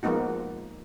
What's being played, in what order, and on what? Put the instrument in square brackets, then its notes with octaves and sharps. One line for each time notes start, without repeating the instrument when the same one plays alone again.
[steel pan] F3 G#3 A#3 B3 D#4 F#4